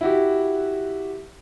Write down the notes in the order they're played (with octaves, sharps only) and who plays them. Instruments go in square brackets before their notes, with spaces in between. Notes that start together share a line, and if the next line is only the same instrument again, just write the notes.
[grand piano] E4 F#4 G4